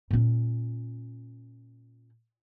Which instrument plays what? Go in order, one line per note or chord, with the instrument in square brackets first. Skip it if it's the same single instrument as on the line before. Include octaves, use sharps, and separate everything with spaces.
[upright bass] A#2 C#4